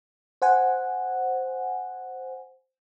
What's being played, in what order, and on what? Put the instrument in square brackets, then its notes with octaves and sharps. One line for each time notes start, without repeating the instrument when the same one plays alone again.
[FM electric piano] C5 F#5 G#5